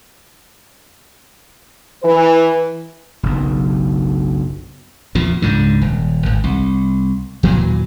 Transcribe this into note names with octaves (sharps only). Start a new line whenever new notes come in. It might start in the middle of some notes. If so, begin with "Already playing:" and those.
E3 B4
F#1 B1
E2 A#2 F3
C#2 G#2 D3
D#1
G#1
C2
D#2 A#2 E3 F#3